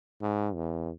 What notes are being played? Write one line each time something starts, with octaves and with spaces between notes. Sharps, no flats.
G#2
E2